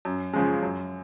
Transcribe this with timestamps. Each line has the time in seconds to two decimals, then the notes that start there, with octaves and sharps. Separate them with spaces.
0.05 F#2
0.33 C#3 F3 G#3
0.63 F#2